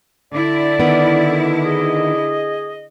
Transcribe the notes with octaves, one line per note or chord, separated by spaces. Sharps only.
D3 E4 D5
D#3 B3
G#4 D#5